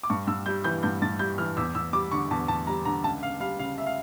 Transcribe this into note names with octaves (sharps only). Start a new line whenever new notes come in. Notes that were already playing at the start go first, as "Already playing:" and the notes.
D6
G2 C#6
G2 E6
G3 G6
E3 G6
G2 G6
G2 A6
G3 G6
E3 F6
E2 E6
E2 E6
G3 D6
D3 C#6
E2 A5
E2 A5
G3 A#5
D3 A#5
C#2 A5
C#2 F5
G3 F5
C#3 F5
E5
F5